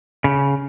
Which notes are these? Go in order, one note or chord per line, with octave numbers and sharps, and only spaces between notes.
C#3